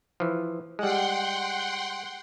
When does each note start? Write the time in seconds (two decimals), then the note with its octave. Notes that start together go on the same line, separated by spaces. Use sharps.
0.20 E3 F3
0.79 G3 G#3 F#5 G5 C6